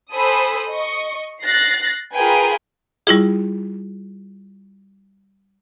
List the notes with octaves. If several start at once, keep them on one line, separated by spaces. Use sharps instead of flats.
A4 C5 G#5 B5 D#6 E6
D#5 C#6
F#6 A6 A#6 C7
F4 G#4 A#4 B4 G5 G#5
G3 E4 F4 G#4